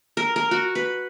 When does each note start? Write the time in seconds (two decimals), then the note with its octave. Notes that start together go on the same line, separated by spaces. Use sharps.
0.17 A#4
0.36 A#4
0.51 F#4
0.75 B4